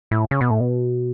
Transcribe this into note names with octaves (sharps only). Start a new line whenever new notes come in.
A2
C#3
B2
A2
B2